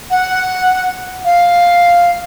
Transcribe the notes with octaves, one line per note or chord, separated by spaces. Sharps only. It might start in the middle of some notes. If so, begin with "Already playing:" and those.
F#5
F5